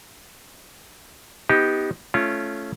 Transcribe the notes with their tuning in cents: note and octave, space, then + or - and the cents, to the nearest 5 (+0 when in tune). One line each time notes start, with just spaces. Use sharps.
B3 +0 D#4 +15 G4 +0
A3 -15 C#4 +0 F4 -25